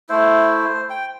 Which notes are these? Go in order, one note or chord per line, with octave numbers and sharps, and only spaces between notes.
A3 E4 C5
G5